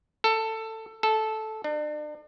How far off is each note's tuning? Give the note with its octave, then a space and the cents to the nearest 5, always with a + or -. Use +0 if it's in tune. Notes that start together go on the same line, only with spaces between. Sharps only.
A4 +15
A4 -10
D4 +40